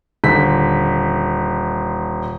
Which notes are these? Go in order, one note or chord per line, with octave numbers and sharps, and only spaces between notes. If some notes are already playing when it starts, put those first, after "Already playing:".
D#1 D3 B6